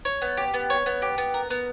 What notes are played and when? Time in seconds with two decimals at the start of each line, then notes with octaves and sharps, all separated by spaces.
0.05 C#5
0.22 B3
0.37 G4
0.54 B3
0.70 C#5
0.86 B3
1.02 G4
1.18 B3
1.34 A#4
1.50 B3